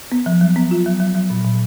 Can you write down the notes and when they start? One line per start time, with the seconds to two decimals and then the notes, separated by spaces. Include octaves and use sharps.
0.12 B3
0.26 F3
0.41 F#3
0.56 B3
0.71 F4
0.86 F#3
1.00 F#3
1.15 F#3
1.30 A#2
1.45 A#2